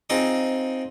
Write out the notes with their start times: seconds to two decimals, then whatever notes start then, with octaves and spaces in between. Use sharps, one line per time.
0.10 C4 D#4 F4 G#4 D#5